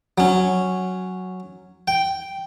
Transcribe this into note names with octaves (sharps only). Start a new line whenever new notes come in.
F#3 C#4
G5